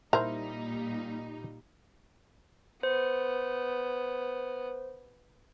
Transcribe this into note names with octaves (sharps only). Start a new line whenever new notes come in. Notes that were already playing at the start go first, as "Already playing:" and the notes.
A#2 G3 D#4 E4 A#4 C5 A#5
B3 C5